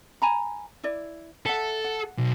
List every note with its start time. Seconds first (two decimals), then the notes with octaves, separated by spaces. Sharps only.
0.22 G#5 A#5 B5
0.83 E4 D5
1.46 A4 E5 F#5
1.84 F#5
2.18 B1